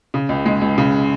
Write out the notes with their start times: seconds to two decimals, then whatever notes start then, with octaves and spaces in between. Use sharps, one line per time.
0.14 C#3
0.29 C#2
0.46 G#3
0.61 C#2
0.78 C#3